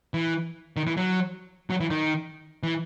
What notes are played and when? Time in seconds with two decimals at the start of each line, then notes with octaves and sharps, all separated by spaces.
0.14 E3
0.77 D#3
0.87 E3
0.97 F#3
1.70 F#3
1.80 E3
1.91 D#3
2.63 E3